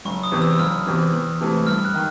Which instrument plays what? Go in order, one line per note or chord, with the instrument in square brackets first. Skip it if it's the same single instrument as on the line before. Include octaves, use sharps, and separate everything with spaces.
[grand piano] F#1 [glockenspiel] C#6
[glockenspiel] D#6
[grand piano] E2 C3 E3
[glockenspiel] E6
[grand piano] F#1 [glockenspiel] F6
[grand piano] E2 C3 E3
E2
C3 E3 A3
[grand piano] G2 [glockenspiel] F6
[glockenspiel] F#6
[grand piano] D#3